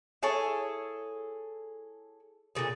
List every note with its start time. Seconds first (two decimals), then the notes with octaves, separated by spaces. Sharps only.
0.23 E4 G#4 A4 C#5
2.55 A#2 D3 E3 G#4